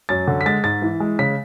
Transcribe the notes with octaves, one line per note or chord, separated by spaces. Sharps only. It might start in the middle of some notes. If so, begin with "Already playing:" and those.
F#2 A6
D3
B6
G#3 A6
G#2 A6
E3
G#3
C#3 B6